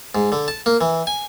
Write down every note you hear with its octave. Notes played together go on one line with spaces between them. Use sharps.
G#2
D3
A5
A#3
E3
G#5